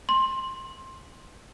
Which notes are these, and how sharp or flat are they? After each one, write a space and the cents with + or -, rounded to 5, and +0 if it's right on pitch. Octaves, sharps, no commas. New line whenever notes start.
C6 +15